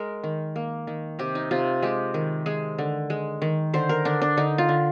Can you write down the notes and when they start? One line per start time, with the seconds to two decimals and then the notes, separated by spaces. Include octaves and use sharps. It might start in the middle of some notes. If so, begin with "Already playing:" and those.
Already playing: G#3 A#4
0.23 D#3
0.56 A#3
0.87 D#3
1.19 C3 G4
1.35 D#4
1.51 C3 F4
1.82 G#3 G4
2.14 D#3
2.46 G#3 G#4
2.78 D3
3.10 G#3
3.42 D#3
3.74 D3 C5
3.89 A#4
4.05 D3 D4
4.21 D4
4.37 D3 D#4
4.58 F4
4.69 D3